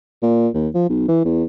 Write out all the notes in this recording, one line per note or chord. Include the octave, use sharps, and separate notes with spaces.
A#2
D#2
F3
B1
E3
E2